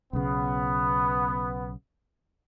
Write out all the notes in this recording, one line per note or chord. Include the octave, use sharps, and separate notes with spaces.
B1 C#3 B3